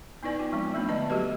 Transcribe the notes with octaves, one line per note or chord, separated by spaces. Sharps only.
B3 D#4 E4 B4 D5 G#5
F4 G5
F3 G#3 C4
G3 A3 B3 D4
D3 D5 D#5 A5
F#3 A3 F#4 G4 A4 B4